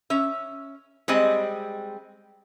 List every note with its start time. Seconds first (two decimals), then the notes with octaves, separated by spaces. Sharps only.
0.10 C#4 E5
1.08 G3 G#3 C4 D#5